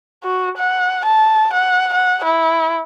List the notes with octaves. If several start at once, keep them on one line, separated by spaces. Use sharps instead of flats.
F#4
F#5
A5
F#5
F#5
E4